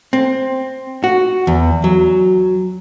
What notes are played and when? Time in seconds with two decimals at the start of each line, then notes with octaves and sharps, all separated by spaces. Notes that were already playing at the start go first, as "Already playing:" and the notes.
0.13 C4
1.04 F#4
1.47 E2
1.84 F#3